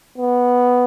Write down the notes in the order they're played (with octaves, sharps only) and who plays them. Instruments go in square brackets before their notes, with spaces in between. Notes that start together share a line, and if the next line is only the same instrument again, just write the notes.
[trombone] B3